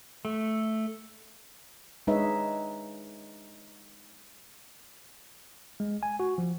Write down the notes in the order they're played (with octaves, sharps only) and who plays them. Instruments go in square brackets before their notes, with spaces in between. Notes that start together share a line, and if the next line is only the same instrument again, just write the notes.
[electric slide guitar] A3
[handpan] G#3 D4 D#4 B4 C#5 E5
[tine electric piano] G#3
G#5
F#4
F3